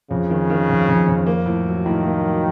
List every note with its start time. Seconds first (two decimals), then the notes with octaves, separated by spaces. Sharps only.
0.10 F2 C#3
0.30 D#3
0.50 D#3
0.69 F2
0.88 F2
1.08 F2
1.26 A#3
1.46 A2
1.66 F#3
1.85 A2 D#3
2.05 A#3
2.24 F#3